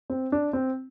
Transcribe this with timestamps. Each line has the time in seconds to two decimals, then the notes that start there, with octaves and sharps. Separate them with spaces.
0.10 C4
0.32 D4
0.53 C4